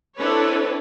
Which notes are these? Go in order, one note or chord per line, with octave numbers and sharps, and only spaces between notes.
C4 D4 E4 A4 B4 C#5